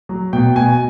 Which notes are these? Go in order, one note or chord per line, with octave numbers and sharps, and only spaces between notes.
F#3
B2 G5
B2 G#5